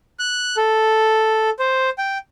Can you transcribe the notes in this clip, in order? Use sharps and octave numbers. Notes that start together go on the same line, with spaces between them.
F#6
A4
C5
G5